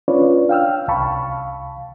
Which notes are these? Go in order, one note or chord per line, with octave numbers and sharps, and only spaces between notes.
C#4 D4 F4 B4 C#5 D5
F5 G5 E6 F6
C2 F5 A5 B5 C#6